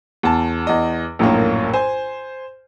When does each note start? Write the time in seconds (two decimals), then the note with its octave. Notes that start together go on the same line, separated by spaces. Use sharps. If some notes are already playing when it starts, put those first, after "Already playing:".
0.23 E2 A5
0.67 E2 D#5
1.19 A#1 F#2 A2 F#3 A#3
1.74 C5 G#5